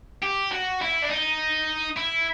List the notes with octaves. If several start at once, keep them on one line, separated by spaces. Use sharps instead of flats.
G4
F#4
E4
D4
D#4
E4